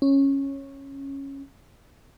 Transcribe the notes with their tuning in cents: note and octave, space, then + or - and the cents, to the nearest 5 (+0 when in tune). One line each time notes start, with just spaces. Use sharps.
C#4 -10